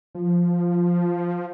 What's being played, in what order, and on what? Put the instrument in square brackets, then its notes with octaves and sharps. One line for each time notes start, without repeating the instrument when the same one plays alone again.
[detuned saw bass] F3